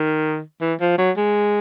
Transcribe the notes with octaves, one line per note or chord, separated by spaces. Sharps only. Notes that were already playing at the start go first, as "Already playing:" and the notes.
Already playing: D#3
E3
F3
F#3
G#3